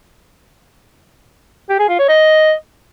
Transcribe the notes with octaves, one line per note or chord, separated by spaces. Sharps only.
G4
G#4
F4
C#5
D#5